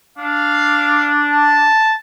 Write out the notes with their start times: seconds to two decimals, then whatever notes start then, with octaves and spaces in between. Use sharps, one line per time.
0.18 D4 F5
1.30 A5